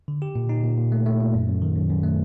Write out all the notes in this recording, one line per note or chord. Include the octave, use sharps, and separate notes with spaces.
D3
G4
A#2
D#4
A#2
A#2
A3
A3
A#2
F#2
F#2
D#3
F#2
F#2
A3